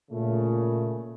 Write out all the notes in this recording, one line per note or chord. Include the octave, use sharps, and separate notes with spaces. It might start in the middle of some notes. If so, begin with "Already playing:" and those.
A#2 C#3 A3